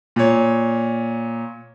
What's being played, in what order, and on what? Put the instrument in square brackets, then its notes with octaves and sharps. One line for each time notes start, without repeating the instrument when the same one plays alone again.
[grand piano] A#2 C#5